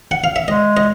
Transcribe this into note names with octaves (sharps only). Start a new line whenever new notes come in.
F#5
F5
E5
G#3 D#5
D#5